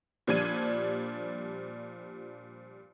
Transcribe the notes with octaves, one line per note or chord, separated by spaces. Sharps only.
A#2 F3 G3 D4 G#6 D#7